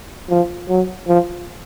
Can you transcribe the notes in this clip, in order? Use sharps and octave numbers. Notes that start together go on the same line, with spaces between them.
F3
F#3
F3